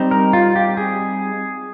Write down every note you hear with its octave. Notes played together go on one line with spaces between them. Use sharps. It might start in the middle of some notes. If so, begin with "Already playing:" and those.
Already playing: G3 C4 D#4
A#4
F4
G4
G#4